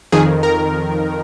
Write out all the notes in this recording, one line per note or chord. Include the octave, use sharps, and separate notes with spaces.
F2 D#3 G#4
A#4